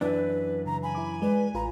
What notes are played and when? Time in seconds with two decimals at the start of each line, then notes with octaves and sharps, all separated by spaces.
0.01 F#2 E3 D4 B4
0.66 C#3 A#5
0.83 G#5 B5
0.95 E4 D6
1.22 G#3 B4 D5
1.54 A1 F4 B4 A#5